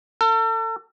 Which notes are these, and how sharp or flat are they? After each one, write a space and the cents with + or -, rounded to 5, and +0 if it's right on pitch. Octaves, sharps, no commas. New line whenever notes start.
A4 +40